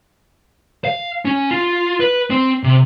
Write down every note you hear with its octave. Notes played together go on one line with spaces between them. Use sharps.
F5
C#4
F4
B4
C4
C3